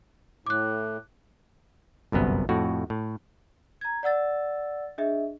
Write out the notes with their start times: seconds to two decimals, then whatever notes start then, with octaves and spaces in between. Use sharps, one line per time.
0.46 A2 D6 F#6
2.12 G1 C2 F#2 B3
2.49 F2 A2 F#4
2.90 A2
3.81 A#5 G#6
4.03 D5 F#5 E6 A6
4.98 D4 G#4 D#5 E5